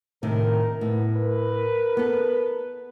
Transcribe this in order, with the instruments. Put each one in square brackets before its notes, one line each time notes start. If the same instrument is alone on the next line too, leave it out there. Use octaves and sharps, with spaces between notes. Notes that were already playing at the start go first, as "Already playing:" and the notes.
[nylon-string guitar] A2 C3 D#3 [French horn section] A#4
[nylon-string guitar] A2 [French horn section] B3
[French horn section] A#4 B4
[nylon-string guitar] B3 A4